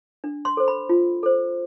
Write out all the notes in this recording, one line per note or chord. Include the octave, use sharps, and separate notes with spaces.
D4
C6
A4 C5
B5
F4
A4 C5